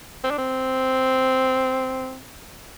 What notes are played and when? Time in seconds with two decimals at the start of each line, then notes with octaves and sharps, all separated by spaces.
0.24 C4
0.31 D4
0.38 C4